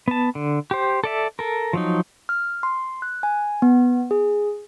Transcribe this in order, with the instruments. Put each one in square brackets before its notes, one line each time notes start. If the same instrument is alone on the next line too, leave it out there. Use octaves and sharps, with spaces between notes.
[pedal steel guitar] B3 A5
D3
G4 C5
A4 D5 E5
A4 A#4
F3 F#3 D#4
[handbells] F6
C6
F#6
G#5
B3
G#4